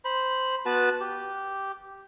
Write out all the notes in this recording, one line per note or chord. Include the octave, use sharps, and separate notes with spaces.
C5 B5
B3 F#4 B4 A5
G4